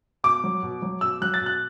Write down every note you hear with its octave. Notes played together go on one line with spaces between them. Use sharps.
B2 D6
F#3
B2
F#3
B2 E6
F#3 F#6
A6
B2
F#6